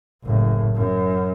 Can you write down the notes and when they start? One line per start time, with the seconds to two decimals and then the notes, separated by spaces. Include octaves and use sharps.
0.24 F#1 A2
0.74 F#2